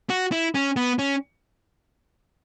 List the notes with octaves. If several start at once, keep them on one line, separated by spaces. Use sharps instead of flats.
F#4
E4
C#4
B3
C#4